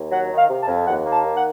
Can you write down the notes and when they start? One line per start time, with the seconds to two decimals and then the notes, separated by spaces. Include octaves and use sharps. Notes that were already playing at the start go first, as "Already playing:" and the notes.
Already playing: D#2
0.11 F#3 F#5
0.30 D#3
0.36 F5
0.49 C3
0.62 A5
0.67 F2
0.86 D#2 F#5
1.05 A#3
1.11 A5
1.23 D#3
1.36 F#5